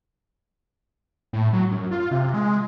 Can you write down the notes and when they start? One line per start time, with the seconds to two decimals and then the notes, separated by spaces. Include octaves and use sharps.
1.33 A2
1.53 F#3
1.71 F#2
1.91 F4
2.11 C3
2.34 G#3